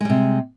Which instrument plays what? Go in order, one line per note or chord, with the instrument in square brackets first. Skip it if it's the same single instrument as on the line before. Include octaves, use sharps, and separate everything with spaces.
[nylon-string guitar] G#3
G3
C3